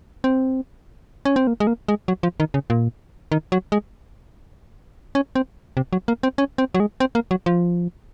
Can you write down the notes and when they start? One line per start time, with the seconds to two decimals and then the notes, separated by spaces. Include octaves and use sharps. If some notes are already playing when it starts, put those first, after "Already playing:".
0.24 C4
1.25 C#4
1.36 C4
1.47 A#3
1.60 G#3
1.67 A#3
1.88 G#3
2.08 F#3
2.23 F3
2.40 D#3
2.54 C#3
2.70 A#2
3.32 D#3
3.52 F#3
3.72 G#3
5.15 C#4
5.35 C4
5.77 C3
5.93 F#3
6.08 A#3
6.23 C4
6.38 C#4
6.58 C4
6.75 F#3
6.80 G#3
7.00 C4
7.15 A#3
7.31 F#3
7.46 F3